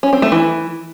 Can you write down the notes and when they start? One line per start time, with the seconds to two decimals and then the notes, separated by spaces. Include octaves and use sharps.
0.03 C#4
0.13 C4
0.22 A3
0.32 E3